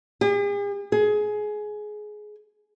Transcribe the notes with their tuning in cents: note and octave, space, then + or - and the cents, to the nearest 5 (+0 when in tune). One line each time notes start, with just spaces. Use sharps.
G#4 -45
G#4 +20